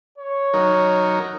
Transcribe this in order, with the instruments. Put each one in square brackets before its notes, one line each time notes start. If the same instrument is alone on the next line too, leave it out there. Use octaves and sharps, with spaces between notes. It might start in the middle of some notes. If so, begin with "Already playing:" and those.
[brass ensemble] C#5
[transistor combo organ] F#3 D#4 A#4